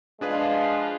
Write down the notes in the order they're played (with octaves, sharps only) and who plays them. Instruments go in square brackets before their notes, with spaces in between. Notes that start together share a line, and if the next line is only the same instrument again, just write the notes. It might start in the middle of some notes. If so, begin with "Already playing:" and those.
[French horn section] F3 F4 [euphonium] G#3 [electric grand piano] D4 G#4 B4